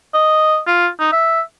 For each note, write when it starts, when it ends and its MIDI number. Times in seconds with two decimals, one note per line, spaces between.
0.14 0.59 75
0.67 0.87 65
1.00 1.10 63
1.12 1.41 76